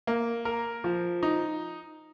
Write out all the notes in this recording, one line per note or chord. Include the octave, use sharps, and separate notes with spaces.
A#3
A#4
F3
D#4